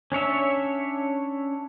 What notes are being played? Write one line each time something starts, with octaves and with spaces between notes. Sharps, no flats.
C#4 D4 C#5 E5